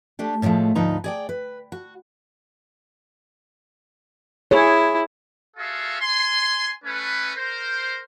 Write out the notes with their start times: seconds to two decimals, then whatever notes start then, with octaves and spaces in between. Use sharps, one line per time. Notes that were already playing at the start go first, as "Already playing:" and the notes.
0.19 A3 D4 G4
0.42 A2 D3 F3 G#3 A3
0.75 D2 G#2 F3 D#4 B4 A#5
1.04 G#4 D5 G5
1.29 B4
1.72 F#4
4.51 E4 G#4 C#5
5.57 F4 F#4 G#4 A4 E5 F5
6.00 G#5 C6
6.84 A3 C#4 B4
7.36 A#4 C5